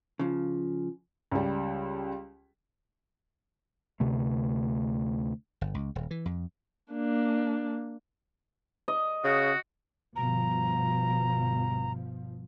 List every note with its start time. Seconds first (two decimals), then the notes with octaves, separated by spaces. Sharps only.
0.19 C#3 F3
1.32 C#2 G3
4.00 D2 C3 A3
5.61 G1
5.74 C#2
5.95 D#1
6.11 E3
6.26 F2
6.92 A#3 D4
8.88 D#5
9.24 C#3 F#4
10.16 G1 B2 F3 A#5